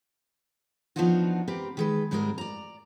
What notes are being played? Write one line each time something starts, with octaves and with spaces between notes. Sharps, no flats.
F3 B3 D4 D#4 F4 F#4
C4 G4 A#4 B4
D#3 G#3 B4
G#2 G3 G#3 C4 F#4 A#4
D5 A#5